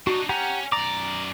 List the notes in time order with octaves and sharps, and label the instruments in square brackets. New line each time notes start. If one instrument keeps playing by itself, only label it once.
[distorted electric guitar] D4 D#4 [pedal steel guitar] F#4
[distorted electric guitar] C#4 [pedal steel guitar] G4 F#5 A#5
[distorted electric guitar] F#2 D5 [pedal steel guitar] A#5 D6